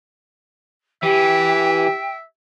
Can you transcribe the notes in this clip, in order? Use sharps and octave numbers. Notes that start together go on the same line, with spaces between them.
E3 G4 E5 G5